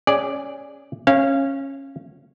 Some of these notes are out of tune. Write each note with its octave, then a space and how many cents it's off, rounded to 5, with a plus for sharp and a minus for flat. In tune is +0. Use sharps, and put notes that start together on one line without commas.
C#4 +0 G#4 -20 D5 +0
C#4 -20 F5 -20